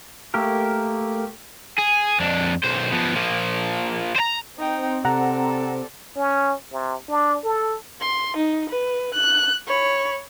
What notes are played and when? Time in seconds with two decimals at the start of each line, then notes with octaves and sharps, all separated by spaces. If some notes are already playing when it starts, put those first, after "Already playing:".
0.34 A3 A#3 G4 A#4
1.78 G#4
2.20 F2 D4
2.64 B1 C5
2.92 F3 B3
3.16 F3 A#3
4.16 C5 A#5
4.58 C4 D#4 G5
5.05 C3 A4 D5 F#5 A#5
6.16 C#4
6.72 C3
7.08 D4
7.44 A4
8.01 C6
8.37 D#4
8.70 B4
9.14 F#6
9.67 C#5 B5